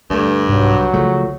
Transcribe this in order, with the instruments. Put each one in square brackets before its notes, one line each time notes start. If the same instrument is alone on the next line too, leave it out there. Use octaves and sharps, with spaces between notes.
[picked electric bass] D2 A3 [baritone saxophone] G2
[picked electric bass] C2 [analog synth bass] G#2 [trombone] F#3
[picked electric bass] C#2 F3 A3 [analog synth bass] C#3